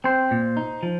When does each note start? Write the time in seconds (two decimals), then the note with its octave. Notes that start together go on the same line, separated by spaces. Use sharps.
0.04 C4 C5
0.31 A#2
0.57 D#4
0.83 F3